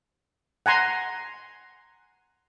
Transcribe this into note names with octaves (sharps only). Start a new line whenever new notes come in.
F#5 G#5 A#5 C6